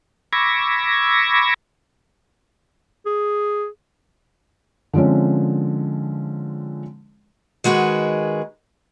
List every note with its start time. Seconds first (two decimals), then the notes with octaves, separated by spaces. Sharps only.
0.33 B5 C#6 D6 E6 G#6 A#6
3.06 G#4
4.93 D3 F3 G#3 C4 C#4
7.64 D#3 G#3 F#4 G#4 B4